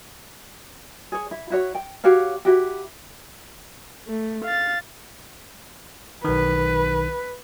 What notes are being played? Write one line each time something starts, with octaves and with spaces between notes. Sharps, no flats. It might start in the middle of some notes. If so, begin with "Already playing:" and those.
G#4 C#5
E4
E4 F#4 C#5
G5
F#4 G4 C#5 F5
E4 F#4 G4
A3
F5 A6
B1 D#3 B4